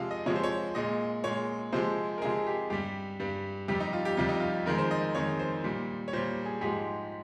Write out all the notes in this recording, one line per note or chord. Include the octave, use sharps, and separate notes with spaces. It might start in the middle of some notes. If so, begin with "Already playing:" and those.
Already playing: C3 F3 G#3 F5
D#5
C3 F3 G#3 C#5
C5
C#5
A#2 G#3 D#5
A#2 G#3 C#5
C3 F3 G#3 C5
A#4
C3 F3 G#3 G#4
G4
G2 G3 G4
G2 G3
F2 C3 G3 G4
D#4
F4
G4
F2 C3 G3 F4
D#4
F4
F2 D#3 G#3 A#4
C5
D#5
F2 D#3 G#3 C#5
C5
A#2 G3
C#5
A#2 G3 C5
G#4
G#2 F3 G#3 G4